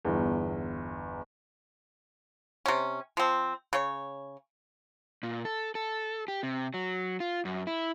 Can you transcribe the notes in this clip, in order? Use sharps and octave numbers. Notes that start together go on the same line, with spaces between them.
G1 E2
C3 C#4
F3 C4
C#3 C#5
A#2
A4
A4
G4
C3
F#3
F4
F#2
E4